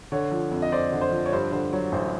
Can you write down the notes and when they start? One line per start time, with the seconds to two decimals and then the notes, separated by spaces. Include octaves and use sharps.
0.12 D3 C#5
0.32 F3
0.51 F2
0.62 D#5
0.72 F2 C5 D5
0.92 D3
1.01 C5
1.11 F3
1.26 C#5
1.32 G2 C5
1.52 D3 C5
1.73 F#3 C#5
1.92 A1 C5